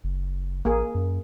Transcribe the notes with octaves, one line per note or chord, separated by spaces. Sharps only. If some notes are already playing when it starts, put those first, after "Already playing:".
F#1
A1 A#3 G#4
F#2